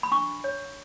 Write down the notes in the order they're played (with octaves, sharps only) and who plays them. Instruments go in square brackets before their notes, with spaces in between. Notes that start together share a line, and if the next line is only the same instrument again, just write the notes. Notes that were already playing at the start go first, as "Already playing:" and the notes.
[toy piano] B5
D4 C#6
C#5